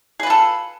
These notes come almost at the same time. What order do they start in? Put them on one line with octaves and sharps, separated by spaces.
G#4 B4 F4 A4